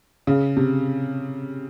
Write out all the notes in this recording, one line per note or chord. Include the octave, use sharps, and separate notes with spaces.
C#3
C3